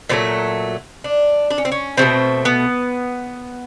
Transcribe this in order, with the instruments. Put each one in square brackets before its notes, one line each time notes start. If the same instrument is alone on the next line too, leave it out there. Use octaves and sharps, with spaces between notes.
[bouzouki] A#2 F#3 A3 C4
D4
D4
C#4
C4
C#4
B2 F#3 A3 C4
B3